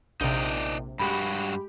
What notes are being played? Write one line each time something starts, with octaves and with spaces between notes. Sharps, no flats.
A#1 C3 D#4 D5
G2 G#3 F#4 G4 B5